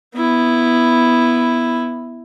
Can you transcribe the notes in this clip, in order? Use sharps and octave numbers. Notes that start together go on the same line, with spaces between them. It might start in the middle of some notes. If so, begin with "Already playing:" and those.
B3 E4